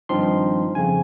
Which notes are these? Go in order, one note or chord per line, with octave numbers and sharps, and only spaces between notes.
G#1 G2 F3 C4 D#4 C6
F2 C#3 F3 C4 G#5